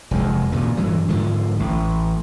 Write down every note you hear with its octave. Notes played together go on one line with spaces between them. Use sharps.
F1 E2 G#3
G2 A#2 C#3 G#3
G2 E3 F#3
G#2 D3 F3
A1